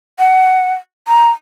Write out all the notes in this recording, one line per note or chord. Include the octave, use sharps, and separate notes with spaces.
F#5
A#5